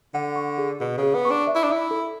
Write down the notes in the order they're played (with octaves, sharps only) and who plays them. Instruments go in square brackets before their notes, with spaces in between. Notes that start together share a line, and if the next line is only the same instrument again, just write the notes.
[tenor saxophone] D3 [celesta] F#5
[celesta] C#6
G#4
[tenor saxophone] B2 [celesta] G#4
[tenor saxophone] C#3
[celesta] G#4
[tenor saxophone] B3
[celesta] C#6
[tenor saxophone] D4
[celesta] E5
[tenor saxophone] E4
D4
[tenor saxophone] E4 [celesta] E5
[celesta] A4